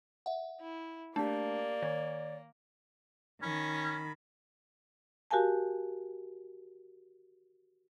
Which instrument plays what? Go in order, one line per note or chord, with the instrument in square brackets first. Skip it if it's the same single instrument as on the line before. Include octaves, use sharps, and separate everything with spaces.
[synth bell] E5 F#5
[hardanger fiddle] E4
[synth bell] A3 D4 [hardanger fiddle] A#3 [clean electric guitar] G4 A5 [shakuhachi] D5
[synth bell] D#3 [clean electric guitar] C#5
[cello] D#3 [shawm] C#4 [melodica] B5
[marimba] F#4 G4 A#4 F5 G#5 A5